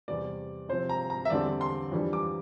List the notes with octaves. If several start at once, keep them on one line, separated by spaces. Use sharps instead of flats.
E2 C3 G3 D5
C3 F3 C4 C5
A#5
A#5
E5
E2 D3 G3 C4 D5
C6
F2 E3 G3 D4
D6